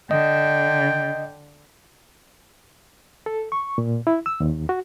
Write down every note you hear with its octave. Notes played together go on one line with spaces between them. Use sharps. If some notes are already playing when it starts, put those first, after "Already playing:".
D3 D#5 G5
A4
C#6
A#2
E4
E6
D#2
F#4